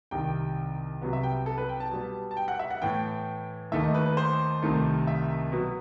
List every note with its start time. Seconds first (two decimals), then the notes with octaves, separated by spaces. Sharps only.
0.11 C2 C3 D#3 G5
1.02 C2 C3 F#3 B3
1.13 E5
1.23 G5
1.46 A4
1.58 B4
1.69 G5
1.80 A5
1.91 B2 G3 B3
2.31 A5
2.37 G5
2.48 F#5
2.59 E5
2.70 F#5
2.81 A2 E3 B3 G5
3.72 D#2 D#3 A3 E5
3.83 D#5
3.94 B4
4.06 B4
4.17 C5
4.62 C2 C3 D#3 A3
5.07 E5
5.52 B2 F#3 B3